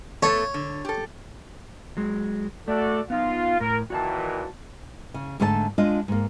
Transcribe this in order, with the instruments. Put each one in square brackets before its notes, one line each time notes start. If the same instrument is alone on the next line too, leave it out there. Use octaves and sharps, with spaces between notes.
[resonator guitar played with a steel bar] A3 B3 A4 [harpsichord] C#5
[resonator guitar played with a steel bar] D3
G4 A4
[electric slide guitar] F#3 G#3
[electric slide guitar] A3 [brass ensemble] F#4 A4 D5
[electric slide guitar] B3 D#4 [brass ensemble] F4
[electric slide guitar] A2 [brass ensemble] A#4
[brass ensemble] A#2 D#3 E3 [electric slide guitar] F#4 C#5 A5
[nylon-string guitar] C#3
G#2 D3 A3 C5 A5
G#3 D4 F4 D#5
G#2 A#3